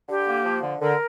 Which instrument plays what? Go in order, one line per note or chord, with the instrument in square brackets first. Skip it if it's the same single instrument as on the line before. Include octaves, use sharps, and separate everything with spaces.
[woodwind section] D3 [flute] G4
[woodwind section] A#3
F3
D3
[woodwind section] D3 [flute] A#4